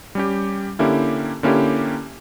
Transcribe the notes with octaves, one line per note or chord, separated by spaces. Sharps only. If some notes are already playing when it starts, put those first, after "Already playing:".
G3 C#4 G4
D3 A#3 C#4 E4 G4
D3 A#3 C#4 E4 G4